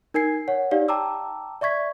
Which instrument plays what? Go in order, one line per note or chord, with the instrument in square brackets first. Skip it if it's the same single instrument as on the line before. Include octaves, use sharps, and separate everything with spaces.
[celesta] D#4 A#4 G#5 G#6 C7
C#5 F#5
D#4 G4 D5 F5
G5 A5 A#5 D6 E6
D5 E5 C#6 G#6 B6